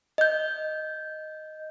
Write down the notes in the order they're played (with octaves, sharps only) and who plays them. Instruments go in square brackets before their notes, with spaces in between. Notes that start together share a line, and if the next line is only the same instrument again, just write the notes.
[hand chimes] D#5 G6